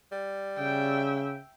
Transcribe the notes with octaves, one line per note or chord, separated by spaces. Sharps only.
G3
C#3 E5 G5